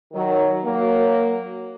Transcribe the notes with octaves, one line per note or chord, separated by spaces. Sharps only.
D#3 F#3
F#3 A#3